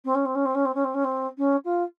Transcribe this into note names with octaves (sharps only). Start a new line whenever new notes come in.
C4
C#4
C4
C#4
C4
C#4
C4
C#4
C4
C#4
C4
C#4
F4